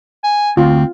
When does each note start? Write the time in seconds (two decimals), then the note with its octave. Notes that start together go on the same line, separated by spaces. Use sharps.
0.24 G#5
0.57 D2 C4 F4